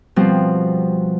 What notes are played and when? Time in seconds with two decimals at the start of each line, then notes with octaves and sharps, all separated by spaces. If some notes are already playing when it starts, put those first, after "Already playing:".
0.16 B2 F3 G3 C4